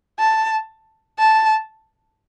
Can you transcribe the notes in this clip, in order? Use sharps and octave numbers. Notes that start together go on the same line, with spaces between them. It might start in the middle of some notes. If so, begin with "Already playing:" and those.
A5
A5